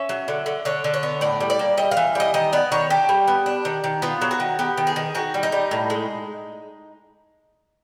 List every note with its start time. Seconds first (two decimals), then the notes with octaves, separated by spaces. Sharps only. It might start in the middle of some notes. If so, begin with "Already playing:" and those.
Already playing: C#4 E5
0.09 F#3
0.28 D3
0.46 D3
0.65 D3 C#5
0.84 D3
0.94 C#5
1.03 B3
1.21 A2 D5
1.40 G3
1.50 D5
1.59 A#3
1.77 G3 D#5
1.91 F5
1.97 E3
2.15 G3 D#5
2.34 D#3 D#5
2.53 B3 D5
2.72 D#3 C#5
2.90 D4 G4
3.09 G3
3.27 B3
3.46 D4
3.65 D#3
3.84 D#3
4.02 B3 F4
4.21 F#3
4.31 F#4
4.40 D#3
4.59 B3 G4
4.77 D#3
4.87 G#4
4.96 D#3
5.15 D#3 F#4
5.34 G3
5.43 D#4
5.52 G3
5.71 A2
5.90 G#3